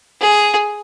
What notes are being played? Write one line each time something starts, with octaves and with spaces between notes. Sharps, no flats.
G#4